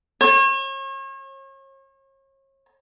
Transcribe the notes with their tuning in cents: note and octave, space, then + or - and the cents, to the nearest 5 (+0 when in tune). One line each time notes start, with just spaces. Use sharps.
C#5 -40